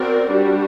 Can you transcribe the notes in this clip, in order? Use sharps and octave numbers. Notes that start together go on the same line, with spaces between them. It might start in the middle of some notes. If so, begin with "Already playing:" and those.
Already playing: C4 F#4 A#4 D5
G3 D4 F#4